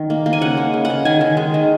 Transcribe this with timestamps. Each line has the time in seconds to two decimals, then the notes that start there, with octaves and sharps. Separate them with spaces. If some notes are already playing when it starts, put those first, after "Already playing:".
Already playing: D#3
0.10 A#3
0.26 A#3
0.33 G#5
0.41 C#3 F#5
0.57 G#3
0.74 C#3
0.85 F#5
0.90 C#3
1.05 D#3 G#5
1.21 D#3
1.37 G#3
1.54 D#3